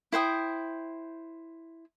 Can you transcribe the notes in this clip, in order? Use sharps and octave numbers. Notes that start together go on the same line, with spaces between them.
E4 C5 G5 D#6